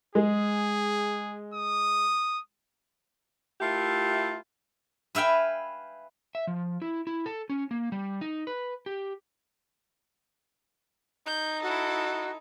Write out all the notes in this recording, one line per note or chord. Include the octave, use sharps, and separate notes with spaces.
G#3 G#4
D#6
A3 E4 F4 G4 A#4
B4 E5 F5 G5 G#5
E5
F3
E4
E4
A4
C#4
A#3
G3
D#4
B4
G4
D#4 G6
E4 F#4 A4